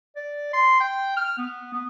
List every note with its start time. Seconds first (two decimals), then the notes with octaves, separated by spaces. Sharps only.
0.16 D5
0.53 C6
0.80 G5
1.17 F6
1.38 B3
1.74 B3